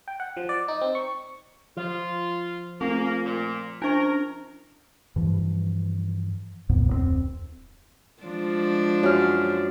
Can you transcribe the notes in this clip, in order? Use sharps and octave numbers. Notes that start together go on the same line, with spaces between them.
G5
F#5
F3
D5
D#4
C4
C#6
F3 F4
A3 A#3 C4 F4
A#2
C#4 D4 A#4 C5 C#6
G2 E3 F3
C2 F2 A#2 B3
D1 F2 G#3 C4
F3 G#3 D4
F#2 F6